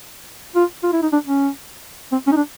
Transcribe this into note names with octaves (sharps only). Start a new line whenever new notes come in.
F4
F4
E4
D#4
D4
C#4
C4
C#4
D#4
D4